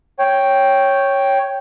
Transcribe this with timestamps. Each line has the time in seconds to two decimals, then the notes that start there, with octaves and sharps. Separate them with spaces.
0.19 C#5 G5